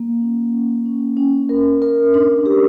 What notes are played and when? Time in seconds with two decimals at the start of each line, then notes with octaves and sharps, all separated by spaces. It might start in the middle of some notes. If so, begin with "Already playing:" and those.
Already playing: A#3
0.21 C#4
0.53 C#4
0.85 C#4
1.17 C#4
1.49 A#4
1.82 A#4
2.14 D4
2.46 G4